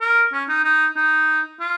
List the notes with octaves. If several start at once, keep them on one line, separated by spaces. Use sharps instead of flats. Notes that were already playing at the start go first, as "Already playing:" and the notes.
A#4
C#4
D#4
D#4
D#4
F4